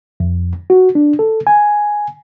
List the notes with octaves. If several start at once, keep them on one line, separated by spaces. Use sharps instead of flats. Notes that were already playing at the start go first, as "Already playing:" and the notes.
F2
F#4
D4
A4
G#5